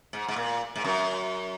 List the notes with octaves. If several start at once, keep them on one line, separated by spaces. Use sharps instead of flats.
G#2
G#2
A#2
G#2
F#2